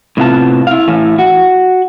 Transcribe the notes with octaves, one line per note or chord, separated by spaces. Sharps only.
A2 C3 B3 F4 A5
E4 F5
A2 E3 A3
F#4